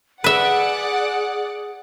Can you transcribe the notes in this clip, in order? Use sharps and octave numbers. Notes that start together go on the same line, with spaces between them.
G#4 B4 D5 E5 F#5